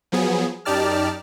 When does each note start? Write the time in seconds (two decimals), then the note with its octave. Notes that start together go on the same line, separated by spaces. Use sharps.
0.12 F3 F#3 B3 G#4
0.65 F#2 D#4 G4 D5 A5 F6